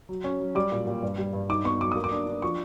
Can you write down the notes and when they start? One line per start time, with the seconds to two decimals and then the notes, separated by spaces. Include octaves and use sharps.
0.09 F#3
0.24 C#4
0.40 F#3
0.55 G3 D6
0.72 A#2
0.87 A#2
1.02 G2
1.18 G3
1.33 G2
1.50 D#4 D6
1.64 B3 C#6
1.81 F#3 D6
1.92 A#3 D#6
2.04 D6
2.12 D4
2.27 D4
2.42 F3 C#6